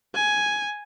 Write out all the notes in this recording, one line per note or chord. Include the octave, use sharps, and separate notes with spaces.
G#5